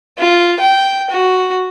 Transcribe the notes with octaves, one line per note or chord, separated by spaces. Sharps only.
F4
G5
F#4